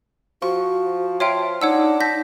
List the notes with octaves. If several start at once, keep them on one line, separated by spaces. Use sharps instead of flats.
F3 F#4 C#6
F4 C#5 E5 G5 A5
D4 D#4 C#5 F#5 E6
A5 G6 A#6 B6